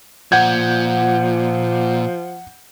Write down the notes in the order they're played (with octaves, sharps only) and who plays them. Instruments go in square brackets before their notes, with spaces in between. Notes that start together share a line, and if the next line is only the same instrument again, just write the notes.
[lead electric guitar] A#2 [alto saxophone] F3 [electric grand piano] F#5 G6 G#6